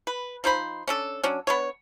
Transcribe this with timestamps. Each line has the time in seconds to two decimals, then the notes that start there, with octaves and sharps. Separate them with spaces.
0.07 B4
0.44 F3 D#4 C5 B5
0.88 C#4 D4 A4
1.23 F#3 C#4 D4
1.47 B3 D4 C#5